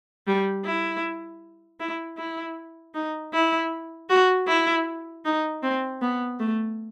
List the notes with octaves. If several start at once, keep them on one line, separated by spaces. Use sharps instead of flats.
G3
E4
E4
E4
D#4
E4
F#4
E4
D#4
C4
B3
A3